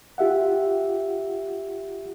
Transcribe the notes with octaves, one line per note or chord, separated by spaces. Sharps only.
F4 G4 E5 F#5